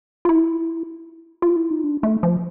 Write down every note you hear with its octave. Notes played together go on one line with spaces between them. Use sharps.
F4
E4
F4
E4
D#4
D4
A3
F3